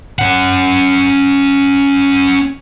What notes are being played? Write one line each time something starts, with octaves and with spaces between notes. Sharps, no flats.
C#4 F#5